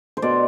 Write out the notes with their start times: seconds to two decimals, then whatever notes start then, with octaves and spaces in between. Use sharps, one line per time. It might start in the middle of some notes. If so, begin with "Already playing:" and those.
0.17 C5
0.22 B2 D5